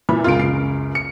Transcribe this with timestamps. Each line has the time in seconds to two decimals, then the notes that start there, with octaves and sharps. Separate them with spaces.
0.09 A#2 E3 B5
0.24 C#2 F#2 F4 D7
0.40 C7
0.95 C#7